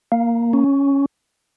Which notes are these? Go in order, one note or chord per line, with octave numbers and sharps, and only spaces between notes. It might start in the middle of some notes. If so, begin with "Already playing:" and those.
A#3
C#4